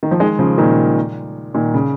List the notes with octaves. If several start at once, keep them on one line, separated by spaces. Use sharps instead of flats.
D#3
F3
D#3 G#3
C#3 F3
A#2 D#3
A#2 D#3
C#3